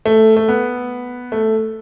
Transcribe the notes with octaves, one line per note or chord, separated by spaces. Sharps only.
A3
A3
B3
A3